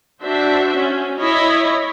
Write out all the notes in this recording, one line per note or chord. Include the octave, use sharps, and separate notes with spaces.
D4 F#4 C5 E5
C#4
E4 C#5 D#5